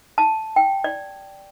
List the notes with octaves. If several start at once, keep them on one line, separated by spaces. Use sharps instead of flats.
A5
G5
D5